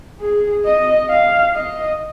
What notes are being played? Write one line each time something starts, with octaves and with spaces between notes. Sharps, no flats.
G#4
D#5
F5
D#5